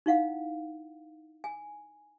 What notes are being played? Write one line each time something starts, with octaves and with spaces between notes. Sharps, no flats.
D#4 E4 F5 F#5
G#5